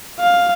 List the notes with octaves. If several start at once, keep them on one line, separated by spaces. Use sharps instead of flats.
F5